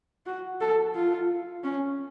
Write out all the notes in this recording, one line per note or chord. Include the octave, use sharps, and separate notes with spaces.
F#4
A4
F4
C#4